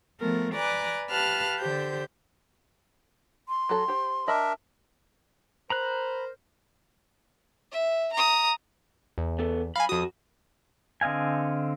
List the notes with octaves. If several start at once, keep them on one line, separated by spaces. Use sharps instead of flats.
F3 A3 B3 A#4
B4 D5 G#5 A#5 D6 F#6
G4 B4 F5 A5 F6 F#6
D3 G4 C5 G6
C6
F#3 F#4 A4
G4 C5
D4 A#4 D#5 E5 B5
A#4 C5 A#5 B5 F#6
E5
A#5 D#6
E2
B3 A4
F#2 F5 G#5 B5
F2 F#4 D#6
D3 C4 D#5 F5 G#5